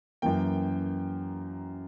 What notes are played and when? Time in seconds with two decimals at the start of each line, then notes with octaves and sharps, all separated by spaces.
0.22 F#2 E3 A#3 G5